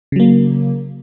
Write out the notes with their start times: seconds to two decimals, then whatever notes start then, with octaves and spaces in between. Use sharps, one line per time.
0.12 C#3
0.16 F#3
0.20 A#3